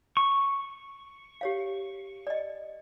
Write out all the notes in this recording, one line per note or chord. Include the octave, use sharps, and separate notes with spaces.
C#6
G4 C#5 F5
D5 D#5